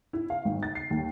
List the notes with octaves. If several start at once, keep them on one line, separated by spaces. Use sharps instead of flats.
E4
F5
G#1
A6
C7
D#2